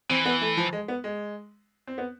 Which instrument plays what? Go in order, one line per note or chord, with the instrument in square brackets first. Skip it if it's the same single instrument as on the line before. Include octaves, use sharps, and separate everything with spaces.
[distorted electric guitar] E3 [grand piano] C4
[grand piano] B3
A3
F3
G#3
B3
G#3
C4
B3